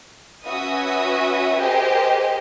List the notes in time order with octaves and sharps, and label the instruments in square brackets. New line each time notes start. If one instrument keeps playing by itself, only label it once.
[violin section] C#4 F#4 B4 E5 D#6
G4 G#4 A#4 C5 D#5